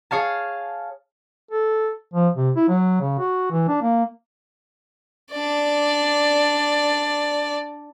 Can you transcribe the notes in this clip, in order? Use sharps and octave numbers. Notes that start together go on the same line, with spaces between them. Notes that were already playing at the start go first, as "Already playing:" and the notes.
G#4 C#5 F5 A5
A4
F3
C3
E4
F#3
C#3
F#4
E3
D4
A#3
D4 D5